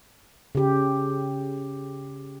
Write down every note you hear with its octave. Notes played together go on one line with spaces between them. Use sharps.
C#3 G4